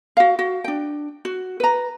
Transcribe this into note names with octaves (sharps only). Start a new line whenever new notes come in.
F#4 F5
F#4
D4 G5
F#4
B4 A#5